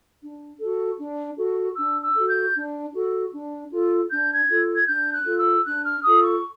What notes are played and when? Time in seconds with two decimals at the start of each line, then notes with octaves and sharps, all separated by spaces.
0.21 D4
0.60 F#4 A4
0.98 D4
1.38 F#4 A4
1.76 D4 E6
2.02 E6
2.15 F#4 A4
2.28 G6
2.54 D4
2.93 F#4 A4
3.32 D4
3.71 F4 A4
4.10 D4 G6
4.35 G#6
4.48 F4 A4
4.76 G#6
4.87 D4 G6
5.13 F#6
5.25 F4 A4
5.38 E6
5.65 D4 F#6
5.85 F6
6.03 F4 A4 D#6
6.23 C#6